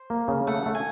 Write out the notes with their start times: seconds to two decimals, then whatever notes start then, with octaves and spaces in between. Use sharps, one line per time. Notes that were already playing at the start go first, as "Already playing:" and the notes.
Already playing: C5
0.10 A#3
0.28 C#3
0.47 A3 F#5
0.66 A3
0.75 G#5